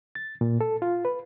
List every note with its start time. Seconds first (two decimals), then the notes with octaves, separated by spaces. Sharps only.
0.15 A6
0.41 A#2
0.61 A4
0.82 F4
1.05 B4